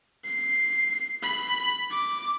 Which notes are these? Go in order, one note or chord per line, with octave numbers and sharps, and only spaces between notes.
C7
B5
D6